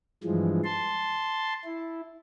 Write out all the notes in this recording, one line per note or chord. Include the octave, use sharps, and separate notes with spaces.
G2 E3 F3 G#3
A5 C6
E4